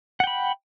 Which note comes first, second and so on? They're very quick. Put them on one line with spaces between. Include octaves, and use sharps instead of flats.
F#5 G5 B5